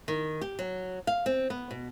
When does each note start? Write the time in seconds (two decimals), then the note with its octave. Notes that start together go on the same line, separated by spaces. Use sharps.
0.08 D#3
0.41 G4
0.59 F#3
1.07 F5
1.26 C4
1.50 B3
1.71 B2